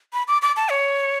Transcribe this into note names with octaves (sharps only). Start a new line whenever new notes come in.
B5
D6
D6
A5
C#5